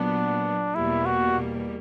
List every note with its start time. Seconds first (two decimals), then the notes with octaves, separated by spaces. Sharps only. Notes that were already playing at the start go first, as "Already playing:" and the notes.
Already playing: A#2 F#3 B3 D4
0.75 E2 B2 G3 A#3 E4
1.06 F#4